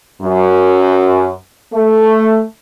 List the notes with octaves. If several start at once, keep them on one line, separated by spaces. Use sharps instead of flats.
F#2
A3